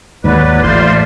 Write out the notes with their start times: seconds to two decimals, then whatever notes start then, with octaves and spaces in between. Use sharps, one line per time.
0.24 D#2 G#2 F#3 B4 D5 D6
0.63 A1 A3 F4 C5 C6